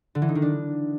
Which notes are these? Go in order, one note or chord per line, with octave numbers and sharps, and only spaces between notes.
D3
E3
D#4
D#3
D4